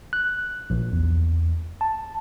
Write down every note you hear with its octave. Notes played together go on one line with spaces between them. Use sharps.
F#6
A#1
E2
A5